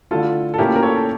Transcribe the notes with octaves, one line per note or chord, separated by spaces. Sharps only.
D3 A3 E4 F4 A4
A4
A#2 A3 C#4 E4 G4 A#4
A#4
A4 C#5
A4